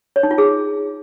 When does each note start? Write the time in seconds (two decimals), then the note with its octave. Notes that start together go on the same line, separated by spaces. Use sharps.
0.16 C#5
0.23 D#4
0.31 F4
0.38 G#4